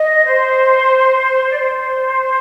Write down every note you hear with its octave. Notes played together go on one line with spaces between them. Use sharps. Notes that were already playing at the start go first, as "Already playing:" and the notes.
Already playing: D#5
C5
D5
C5